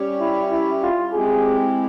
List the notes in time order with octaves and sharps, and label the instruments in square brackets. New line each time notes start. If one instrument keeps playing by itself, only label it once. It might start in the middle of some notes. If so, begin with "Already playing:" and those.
Already playing: [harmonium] G3 C#4 G4 C#5
[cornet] E4
E4
F4
[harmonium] G#3 C4 E4 G4 [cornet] G#4